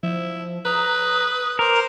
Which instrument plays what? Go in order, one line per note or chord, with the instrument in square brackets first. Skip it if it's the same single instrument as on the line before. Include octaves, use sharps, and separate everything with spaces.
[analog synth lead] F3 [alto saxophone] E4
[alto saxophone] B4 [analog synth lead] A#5 [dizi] D#6
[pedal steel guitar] A#4 [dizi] C5 [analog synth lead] D6